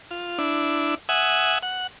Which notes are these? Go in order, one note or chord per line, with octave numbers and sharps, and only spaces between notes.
F4
D4 E4
E5 F#5 G#5 D#6
F#5